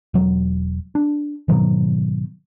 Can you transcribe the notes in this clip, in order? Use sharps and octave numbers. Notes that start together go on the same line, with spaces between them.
E1 F#3
D4
G#2 B2 D#3 F#3